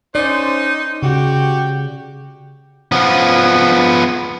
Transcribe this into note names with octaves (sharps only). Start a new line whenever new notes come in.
C#4 D#4 C5 D5
C#3 F#4 G4 G5
F3 B3